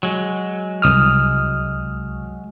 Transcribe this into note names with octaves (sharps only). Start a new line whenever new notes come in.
F#3 G#3
C2 D#6 F6